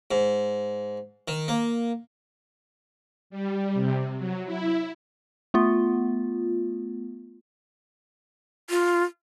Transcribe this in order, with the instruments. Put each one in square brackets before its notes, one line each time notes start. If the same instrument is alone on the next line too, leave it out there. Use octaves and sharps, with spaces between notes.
[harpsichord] G#2
D#3
A#3
[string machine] G3
C3
F#3
E4
[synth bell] A3 B3 F4
[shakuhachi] F4